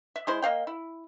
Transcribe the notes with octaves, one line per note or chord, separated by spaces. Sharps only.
E5
G#3 E4 C5 C6
A#3 D#5 F5 G5
E4